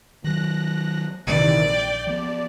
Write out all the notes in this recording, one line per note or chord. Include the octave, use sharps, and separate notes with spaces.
D#3 F#3 F#6 A#6
A#1 C3 D#3 E3 D5
G5 G6
F3 B3 D5